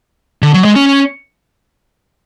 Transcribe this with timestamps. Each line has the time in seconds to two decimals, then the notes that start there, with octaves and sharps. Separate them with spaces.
0.42 D3
0.54 F#3
0.65 G#3
0.76 C#4